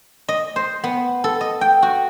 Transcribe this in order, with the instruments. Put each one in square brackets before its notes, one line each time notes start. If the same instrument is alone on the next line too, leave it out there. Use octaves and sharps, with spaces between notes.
[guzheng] D#5
C5
B3
A4
D#5
G5
F#4